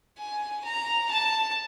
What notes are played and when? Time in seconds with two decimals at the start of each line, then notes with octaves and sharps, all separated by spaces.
0.18 G#5
0.65 A#5
1.11 A5